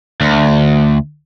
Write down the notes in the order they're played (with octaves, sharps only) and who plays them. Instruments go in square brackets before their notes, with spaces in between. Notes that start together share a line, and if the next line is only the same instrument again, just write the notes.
[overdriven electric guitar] D2